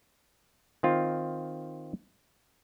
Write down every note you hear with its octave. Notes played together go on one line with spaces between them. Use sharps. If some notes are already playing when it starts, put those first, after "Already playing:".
D#3 C4 F4